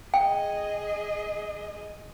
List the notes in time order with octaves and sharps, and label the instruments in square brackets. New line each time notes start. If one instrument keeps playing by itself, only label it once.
[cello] G#4 D#5 [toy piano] G5